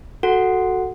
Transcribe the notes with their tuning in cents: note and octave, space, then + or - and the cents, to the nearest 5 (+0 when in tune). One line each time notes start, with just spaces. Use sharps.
F#4 +0 A4 +0 F#5 +0